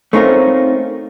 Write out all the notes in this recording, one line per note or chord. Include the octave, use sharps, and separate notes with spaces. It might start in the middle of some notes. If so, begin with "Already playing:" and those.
A3 C4 C#4 D#4 F4 A#4